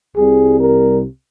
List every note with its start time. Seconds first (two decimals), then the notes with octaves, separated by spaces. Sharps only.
0.17 C2 C3 G3 G#4
0.60 A#4